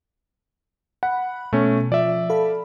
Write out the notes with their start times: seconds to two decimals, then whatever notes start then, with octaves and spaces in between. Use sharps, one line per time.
1.03 F#5 B5
1.53 B2 A3 C#4
1.92 F3 D5 E5
2.30 A4 F5 B5